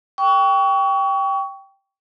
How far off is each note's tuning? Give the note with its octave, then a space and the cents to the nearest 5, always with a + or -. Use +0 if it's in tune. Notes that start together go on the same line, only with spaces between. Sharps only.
G5 +0 C#6 +30